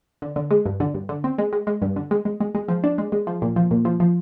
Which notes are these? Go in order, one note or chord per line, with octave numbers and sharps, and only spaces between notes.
D3
D3
G#3
G2
D3
G2
D3
C4
G#3
G#3
G#3
G2
D3
G#3
G#3
G#3
G#3
F3
D4
G#3
G#3
F3
A#2
F3
A#2
F3
F3